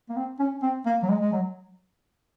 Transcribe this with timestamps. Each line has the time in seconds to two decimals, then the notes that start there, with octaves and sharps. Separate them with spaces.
0.09 A#3
0.16 C4
0.39 C#4
0.62 C4
0.86 A#3
1.03 F#3
1.09 G#3
1.21 G#3
1.32 F#3